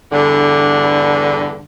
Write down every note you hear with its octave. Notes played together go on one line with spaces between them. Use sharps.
E2 G2 D3